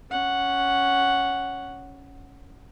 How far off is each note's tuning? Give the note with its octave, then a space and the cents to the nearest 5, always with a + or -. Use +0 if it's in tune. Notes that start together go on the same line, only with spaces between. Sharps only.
C#4 +0 F#5 +0